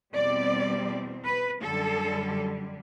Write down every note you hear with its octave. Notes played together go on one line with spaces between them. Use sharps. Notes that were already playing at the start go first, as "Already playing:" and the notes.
E2 B2 G3 C4 D5
B4
F#2 D3 G3 A4